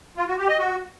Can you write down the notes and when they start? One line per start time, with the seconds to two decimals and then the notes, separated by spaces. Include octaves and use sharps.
0.17 F4
0.27 F#4
0.38 G4
0.48 D#5
0.59 F#4